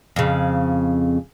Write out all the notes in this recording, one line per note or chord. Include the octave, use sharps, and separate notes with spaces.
F2 C#3